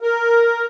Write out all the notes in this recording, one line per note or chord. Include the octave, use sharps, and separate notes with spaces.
A#4